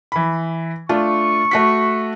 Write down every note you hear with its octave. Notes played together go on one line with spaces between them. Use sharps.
E3 B5
A3 D4 F4 C#6
A3 F#4 B6